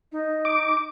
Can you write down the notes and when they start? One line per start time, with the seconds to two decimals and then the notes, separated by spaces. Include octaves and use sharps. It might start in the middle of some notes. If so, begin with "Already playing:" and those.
0.12 D#4
0.45 D6